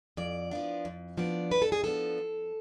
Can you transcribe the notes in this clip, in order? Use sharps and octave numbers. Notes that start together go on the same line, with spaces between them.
F2 D5
F3 B3 D4
F2
F3 B3 D4 D5
F2 B4
A4
G#4
F3 B3 D4 A4
F2